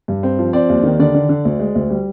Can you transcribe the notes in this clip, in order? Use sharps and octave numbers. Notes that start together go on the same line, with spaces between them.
G2
C4
F3
C4 D5
D#2
D#3
D3 D5
D3
D3
D2
G#3
D2
G3